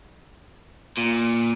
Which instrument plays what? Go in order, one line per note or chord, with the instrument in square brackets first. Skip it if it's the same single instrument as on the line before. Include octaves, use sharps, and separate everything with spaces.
[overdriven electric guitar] A#2